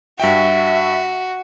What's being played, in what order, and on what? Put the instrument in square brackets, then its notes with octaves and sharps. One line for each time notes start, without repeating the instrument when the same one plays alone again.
[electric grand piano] G2 G5 [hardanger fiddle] F#4 [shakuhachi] E5